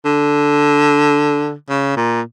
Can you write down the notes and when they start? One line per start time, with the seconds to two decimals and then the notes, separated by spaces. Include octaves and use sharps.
0.05 D3
1.69 C#3
1.96 A#2